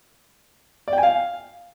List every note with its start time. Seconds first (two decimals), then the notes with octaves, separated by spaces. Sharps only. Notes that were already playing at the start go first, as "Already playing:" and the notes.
0.88 D5
0.93 G5
0.98 G#5
1.03 F5